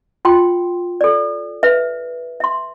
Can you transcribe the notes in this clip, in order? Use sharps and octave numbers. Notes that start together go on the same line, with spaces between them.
F4 G5 C6
A4 D5
B4 E5
E5 C6